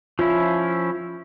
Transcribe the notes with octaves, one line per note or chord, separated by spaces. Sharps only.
F3 C#4 E4 F4